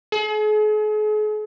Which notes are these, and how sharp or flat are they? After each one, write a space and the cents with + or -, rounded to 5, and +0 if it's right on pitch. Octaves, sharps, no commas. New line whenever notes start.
G#4 +45